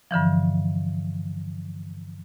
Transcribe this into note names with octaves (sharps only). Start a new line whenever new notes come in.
G2 D3 E3 F3